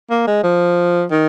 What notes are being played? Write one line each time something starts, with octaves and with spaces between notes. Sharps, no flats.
A#3
G#3
F3
D#3